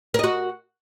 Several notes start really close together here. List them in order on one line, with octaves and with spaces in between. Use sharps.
A#4 D#5 F#4